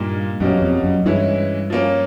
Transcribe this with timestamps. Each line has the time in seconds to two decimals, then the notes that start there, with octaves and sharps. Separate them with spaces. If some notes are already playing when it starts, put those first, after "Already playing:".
Already playing: G2 A#2 G3 A#3 D#4
0.40 F#2 B2 G3 A#3 C#4
0.62 F2
0.84 F#2
1.05 G2 E3 G#3 C#4 E4
1.70 F3 A#3 C#4